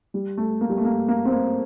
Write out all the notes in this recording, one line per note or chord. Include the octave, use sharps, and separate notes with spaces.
G3
A3
A#3
G3
A3
A#3
A#3
C4
A#3